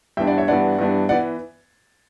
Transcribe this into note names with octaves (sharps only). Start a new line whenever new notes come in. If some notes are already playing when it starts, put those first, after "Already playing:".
G2 E3 B3 D4 E5 G5
D5 F#5
C#5 E5
G2 E3 B3 D4 D5 F#5
G2 E3 B3 D4
E3 B3 D5 F#5